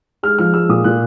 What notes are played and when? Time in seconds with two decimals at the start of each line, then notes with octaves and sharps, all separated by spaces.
0.23 G#3 F6
0.39 F3 F6
0.54 G#3 E6
0.69 A#2 D#6
0.84 A#2 F#6